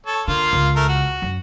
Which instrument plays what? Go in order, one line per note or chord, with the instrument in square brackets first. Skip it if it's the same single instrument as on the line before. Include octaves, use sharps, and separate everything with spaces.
[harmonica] A4 C#5
[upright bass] D3 [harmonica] A#3 F4 F5
[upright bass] C#2
[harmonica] A3 A#4
F#4
[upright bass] F#2